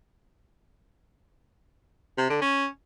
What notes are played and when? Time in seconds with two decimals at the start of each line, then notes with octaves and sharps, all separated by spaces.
2.18 C3
2.30 D3
2.41 C#4